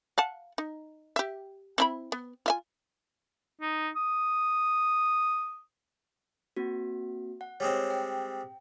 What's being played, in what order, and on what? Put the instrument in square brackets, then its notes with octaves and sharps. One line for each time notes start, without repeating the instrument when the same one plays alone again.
[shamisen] F5 F#5 A5
D#4
G4 E5
C4 E4 B5
B3
F4 E5 G#5
[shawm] D#4
D#6
[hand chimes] A#3 C4 F#4
F#5
[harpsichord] G3 G#3 C4 [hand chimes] C#5
[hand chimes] G5